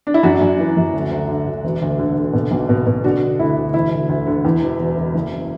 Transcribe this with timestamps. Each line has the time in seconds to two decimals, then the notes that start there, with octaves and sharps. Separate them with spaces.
0.07 D4
0.14 E4
0.23 F#2 D4 F#4
0.41 F#2
0.59 E3
0.77 F#2
0.93 D2
1.11 D2
1.28 D3
1.47 D2
1.64 E1
1.82 D2
1.99 D3
2.17 D3
2.34 B2
2.51 B1
2.69 B2
2.87 B2
3.04 D3 D4 F#4
3.22 D3
3.39 D2 E4
3.57 D2
3.74 E1 E4
3.92 D2
4.09 D2
4.27 D3
4.45 E2
4.61 E1
4.79 E1
4.97 E1
5.14 F#1